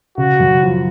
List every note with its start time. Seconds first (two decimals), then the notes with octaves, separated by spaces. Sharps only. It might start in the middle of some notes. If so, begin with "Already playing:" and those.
0.18 C#3 F#4
0.39 F#2
0.62 F3